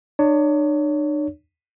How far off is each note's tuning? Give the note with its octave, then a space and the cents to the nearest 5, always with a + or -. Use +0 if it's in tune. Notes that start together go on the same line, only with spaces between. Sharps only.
D4 +45 C#5 +25